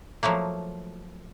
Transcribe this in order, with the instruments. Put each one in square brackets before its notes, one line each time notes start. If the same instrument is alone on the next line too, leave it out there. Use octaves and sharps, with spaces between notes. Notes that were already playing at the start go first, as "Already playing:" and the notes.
[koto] F3 F#3 A3 A#3